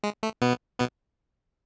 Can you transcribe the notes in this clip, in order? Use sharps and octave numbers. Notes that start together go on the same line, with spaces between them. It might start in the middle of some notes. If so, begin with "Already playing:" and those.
G#3
A3
B2 B3
B2 B3